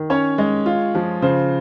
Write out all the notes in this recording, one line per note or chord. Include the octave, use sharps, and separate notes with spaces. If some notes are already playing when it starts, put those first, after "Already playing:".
Already playing: D#3
C#4 C#5
G#3
F4
F3
C#3 C5